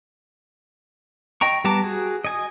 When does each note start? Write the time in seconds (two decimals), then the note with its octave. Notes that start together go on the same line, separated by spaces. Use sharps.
1.41 D#5 G5 A#5 C#6
1.64 G3 B3 A5 A#5 D6
1.84 F#4 G#4
2.25 D#5 G#5 D#6